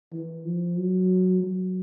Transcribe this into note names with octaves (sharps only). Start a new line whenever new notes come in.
E3
F3
F#3
F#3